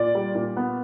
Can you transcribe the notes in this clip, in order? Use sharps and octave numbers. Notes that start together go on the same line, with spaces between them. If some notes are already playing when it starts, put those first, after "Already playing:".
Already playing: A#2 D5
G3
A#2
B3